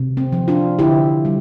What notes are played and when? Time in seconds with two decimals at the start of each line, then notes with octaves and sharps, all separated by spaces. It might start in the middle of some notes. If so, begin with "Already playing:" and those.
Already playing: C3
0.17 C4
0.33 F3
0.48 D4 F4
0.79 D3 E4 G4
1.25 G3